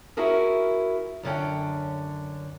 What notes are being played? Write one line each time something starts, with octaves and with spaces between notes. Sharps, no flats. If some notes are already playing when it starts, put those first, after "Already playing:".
C#4 E4 F#4 G#4 A#4
F#2 D3 C#4 G5